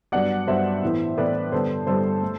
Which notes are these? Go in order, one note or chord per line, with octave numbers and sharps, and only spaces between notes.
G2 F#3 B3 D5 F#5
G2 F#3 B3 C5 E5
A2 E3 B3
A2 E3 B3 B4 D5
G2 D3 G3 B3 A4 C5
G2 D3 G3 B3 A4 C5
A3